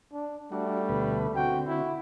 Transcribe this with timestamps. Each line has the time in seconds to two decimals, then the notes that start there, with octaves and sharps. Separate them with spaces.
0.13 D4
0.52 G3 A3 D4 F#4
0.89 D2 B2 B4
1.36 D3 C4 F#4 G5
1.67 E4 F#4